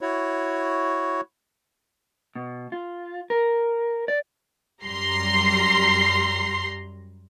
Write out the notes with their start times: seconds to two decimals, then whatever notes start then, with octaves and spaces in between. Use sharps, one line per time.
0.01 E4 F#4 C#5
2.36 B2
2.72 F4
3.30 A#4
4.08 D5
4.83 F#2 G3 A#5 C6 C7